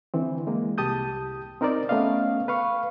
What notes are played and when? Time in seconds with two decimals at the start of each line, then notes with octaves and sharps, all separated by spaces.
0.14 D3 E3 C4
0.47 G#3 A#3
0.78 C2 G4 A5 D#6 G6
1.61 C4 D#4 A#4 C5 D5
1.89 A3 B3 C#4 D#5 F5
2.48 B4 F5 C#6